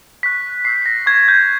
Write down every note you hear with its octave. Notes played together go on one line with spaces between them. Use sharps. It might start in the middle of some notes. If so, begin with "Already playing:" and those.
C#6 F#6 B6
C#6 E6 G6 C7
A#6
C#6 F#6 G#6
G6